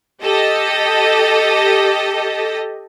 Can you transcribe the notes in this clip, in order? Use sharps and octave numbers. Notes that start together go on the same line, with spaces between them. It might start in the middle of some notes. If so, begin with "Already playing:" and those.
G4 A4 D#5